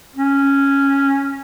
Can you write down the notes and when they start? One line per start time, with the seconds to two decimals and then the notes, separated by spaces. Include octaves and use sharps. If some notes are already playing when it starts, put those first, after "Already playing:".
0.16 C#4